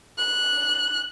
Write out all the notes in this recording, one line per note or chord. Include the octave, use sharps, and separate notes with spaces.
F#6